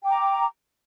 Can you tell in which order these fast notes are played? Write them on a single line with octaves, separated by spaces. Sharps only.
G5 D6 A#5